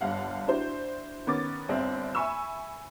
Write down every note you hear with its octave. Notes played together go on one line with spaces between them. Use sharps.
G1 G2 F5 F#5
D4 E4 F#4 C5
D#3 B3 C#4 D6 A6
G1 C4 D5 E5
E5 G#5 B5 C#6 E6